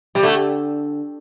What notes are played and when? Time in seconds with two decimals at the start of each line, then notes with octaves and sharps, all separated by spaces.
0.15 C3 G3
0.23 D3 A3